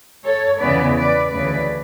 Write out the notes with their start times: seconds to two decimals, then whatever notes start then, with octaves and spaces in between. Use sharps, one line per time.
0.25 A4 C#5
0.60 E2 C#3 E3 B3 B4 D5
0.96 B4 D5
1.31 D2 C#3 E3 A3 C#4 B4 D5